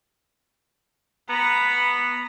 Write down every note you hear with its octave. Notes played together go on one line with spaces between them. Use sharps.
B3 A#5 B5